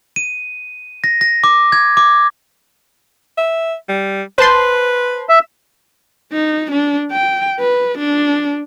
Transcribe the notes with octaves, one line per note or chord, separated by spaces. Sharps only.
D#7
A#6
A#6
D6
G#6
D6
E5
G3
B4 C5 A5 C6
E5
D#4
D4
G5
B4
D4